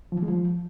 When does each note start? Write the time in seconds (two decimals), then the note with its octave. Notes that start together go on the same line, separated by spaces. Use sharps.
0.12 F3
0.17 E3
0.23 G#3
0.28 F3